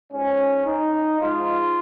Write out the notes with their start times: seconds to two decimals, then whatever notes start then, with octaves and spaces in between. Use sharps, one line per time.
0.12 G#2 F3 C#4
0.66 D#4
1.20 G#2 F3 F4